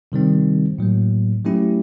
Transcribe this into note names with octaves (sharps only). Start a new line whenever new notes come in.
C3 D#3 G3 C4
A2 F#3 A#3
F#3 A3 C#4 E4 G4